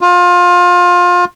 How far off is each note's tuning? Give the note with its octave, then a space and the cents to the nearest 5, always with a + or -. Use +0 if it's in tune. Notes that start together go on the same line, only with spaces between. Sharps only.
F4 +25